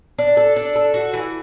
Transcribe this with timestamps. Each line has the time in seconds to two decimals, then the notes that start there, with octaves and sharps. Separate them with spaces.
0.18 D4
0.37 A4
0.56 D4
0.76 A4
0.94 F#4
1.13 E3